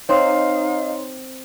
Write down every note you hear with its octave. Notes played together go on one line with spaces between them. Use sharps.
C4 D#4 C#5 F5 C6